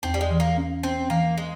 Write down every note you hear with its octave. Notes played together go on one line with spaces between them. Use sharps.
E2 C4
G3
G#3
E3
A#3
C#4
C4 C#4
E3 A#3
G#3